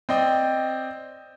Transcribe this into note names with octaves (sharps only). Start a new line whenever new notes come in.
C4 D5 D#5 G5